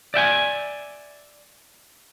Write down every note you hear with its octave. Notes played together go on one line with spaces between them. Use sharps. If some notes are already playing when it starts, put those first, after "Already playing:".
D5 E5 G5 G#5